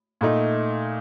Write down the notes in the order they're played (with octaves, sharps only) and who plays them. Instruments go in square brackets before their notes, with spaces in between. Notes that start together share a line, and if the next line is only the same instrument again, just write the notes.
[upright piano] A#2 A3 D#4